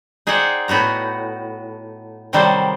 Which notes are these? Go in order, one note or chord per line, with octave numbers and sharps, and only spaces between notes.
D#4 G#4 C5 D5 F#5 G5
A2 B3 F#4 A#5
C3 D#3 F#3 G3 A4 C5